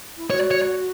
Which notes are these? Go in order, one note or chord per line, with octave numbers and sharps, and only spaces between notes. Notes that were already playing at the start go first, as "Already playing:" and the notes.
E4
F#4 C#5
C#5